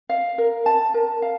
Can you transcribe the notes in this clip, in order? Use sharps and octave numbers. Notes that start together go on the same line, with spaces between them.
F5
A#4
A5
A#4
F5